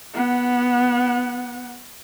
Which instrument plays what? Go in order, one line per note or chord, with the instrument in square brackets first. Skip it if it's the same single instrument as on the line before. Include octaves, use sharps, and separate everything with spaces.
[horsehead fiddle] B3 F#5